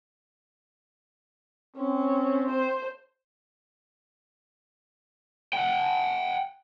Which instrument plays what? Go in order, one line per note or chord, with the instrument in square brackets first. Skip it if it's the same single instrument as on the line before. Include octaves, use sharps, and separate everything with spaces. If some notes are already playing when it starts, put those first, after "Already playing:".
[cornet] C4 [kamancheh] C#4
[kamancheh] C5
[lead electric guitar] F#5 G5